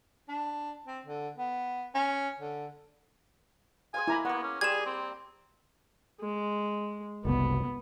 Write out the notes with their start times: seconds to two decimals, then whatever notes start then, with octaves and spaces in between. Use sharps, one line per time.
0.29 D4
0.86 C4
1.06 D3
1.37 B3
1.95 C#4
2.40 D3
3.94 G#4 C5 F5 G#5
4.08 A#3 E4 A#5 B5
4.25 A#3 B3 F#5 C#6
4.43 C#4
4.61 G3 G#4 C5 G#6 E7
4.86 C4
6.21 G#3
7.25 F#1 C2 B3